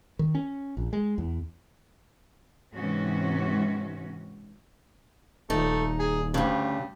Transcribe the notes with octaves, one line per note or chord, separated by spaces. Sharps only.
D#3
C#4
A#1
G#3
E2
G#2 C3 E3 C#4 F#4
D#1 A3 D#4
G#4
D2 G2 C#3